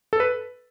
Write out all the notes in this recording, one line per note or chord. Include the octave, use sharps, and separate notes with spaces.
A4
B4